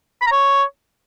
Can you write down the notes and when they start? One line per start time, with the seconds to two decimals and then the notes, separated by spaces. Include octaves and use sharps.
0.22 B5
0.27 A#5
0.32 C#5